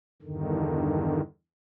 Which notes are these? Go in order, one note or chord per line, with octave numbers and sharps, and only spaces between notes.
E2 G2 D3 D#3